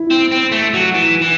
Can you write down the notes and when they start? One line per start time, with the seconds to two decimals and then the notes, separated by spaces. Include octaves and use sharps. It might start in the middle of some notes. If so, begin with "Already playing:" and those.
Already playing: E4
0.10 C4
0.31 C4
0.52 A3
0.74 F#3
0.94 E3
1.21 E3